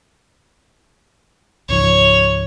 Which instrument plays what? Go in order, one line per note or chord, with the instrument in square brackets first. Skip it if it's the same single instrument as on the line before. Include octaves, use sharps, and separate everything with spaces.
[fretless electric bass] C#2 G#2 F3 [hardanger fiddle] C#5